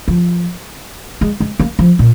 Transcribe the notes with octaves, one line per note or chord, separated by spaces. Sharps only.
F3
G#3
G#3
A#3
F3
A#2